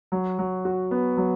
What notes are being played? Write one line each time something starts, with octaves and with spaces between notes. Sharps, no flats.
F#3
F#3
F#4
B3
F#3